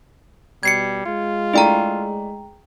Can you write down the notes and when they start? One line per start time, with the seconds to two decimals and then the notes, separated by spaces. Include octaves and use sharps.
0.63 B2 G3 G#6 C7 C#7
1.06 G#3 F4
1.54 A3 D4 E4 G#4 G5 A#5